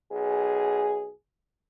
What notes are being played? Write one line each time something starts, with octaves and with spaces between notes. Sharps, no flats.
B1 G#4